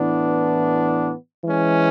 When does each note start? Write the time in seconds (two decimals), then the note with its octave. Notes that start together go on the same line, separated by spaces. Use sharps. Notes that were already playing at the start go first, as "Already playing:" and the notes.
Already playing: A2 E3 B3 D4
1.44 E3 G#3 C#4